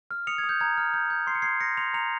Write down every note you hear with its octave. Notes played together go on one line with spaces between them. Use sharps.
F6
D#6 C#7 F7
G#6
D#6
G6
A#5 G#6
F6
G6
G6
C6 C7
C#7
C6 G#6 C7
C6 A#6 C#7
C6 C#7 F7
A#5 C#7 F7